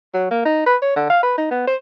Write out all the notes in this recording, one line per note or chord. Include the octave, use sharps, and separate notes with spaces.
F#3
A#3
D#4
B4
C#5
D3
F5
B4
D#4
B3
C5